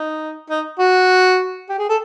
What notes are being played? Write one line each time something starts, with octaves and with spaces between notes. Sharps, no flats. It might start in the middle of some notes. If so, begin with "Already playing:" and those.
Already playing: D#4
D#4
F#4
G4
G#4
A4